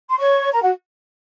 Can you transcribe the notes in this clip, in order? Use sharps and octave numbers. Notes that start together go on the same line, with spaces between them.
C6
C#5 C#6
A#4 A#5
F#4 F#5